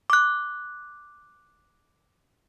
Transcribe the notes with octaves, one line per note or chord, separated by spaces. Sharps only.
D6 F#6